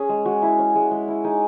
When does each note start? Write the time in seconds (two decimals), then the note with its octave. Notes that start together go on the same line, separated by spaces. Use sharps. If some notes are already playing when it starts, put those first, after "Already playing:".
Already playing: C#4 G#4
0.09 G#3
0.25 G#3 F#4
0.42 E4
0.59 C#4
0.75 G#3
0.91 G#3
1.08 E4
1.24 D#4 G#4